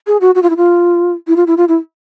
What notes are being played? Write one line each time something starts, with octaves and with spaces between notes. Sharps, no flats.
G#4
F#4
F#4
F4
E4
F4
E4
F4
E4
F4
E4